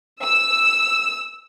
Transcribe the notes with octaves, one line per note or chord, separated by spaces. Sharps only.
E6